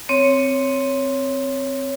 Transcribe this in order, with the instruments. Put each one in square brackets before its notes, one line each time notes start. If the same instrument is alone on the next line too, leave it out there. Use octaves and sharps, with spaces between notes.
[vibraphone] C4 C#5